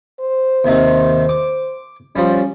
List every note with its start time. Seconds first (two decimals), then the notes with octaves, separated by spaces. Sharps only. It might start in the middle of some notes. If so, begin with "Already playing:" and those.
0.20 C5
0.64 D#2 C3 D#3
1.29 D6
2.16 F3 G3 C#4